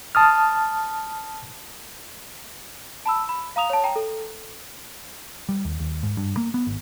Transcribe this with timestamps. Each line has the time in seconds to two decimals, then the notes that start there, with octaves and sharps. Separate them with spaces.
0.15 A5 D#6 F6
3.06 A5 B5 E6
3.29 B5
3.56 F5 A#5 D#6 F7
3.70 C#5 A5
3.84 G5 A#5
3.96 A4
5.49 G3
5.65 D#2
5.80 D#2
6.03 G#2
6.17 G2
6.37 A#3
6.54 B3
6.67 G#1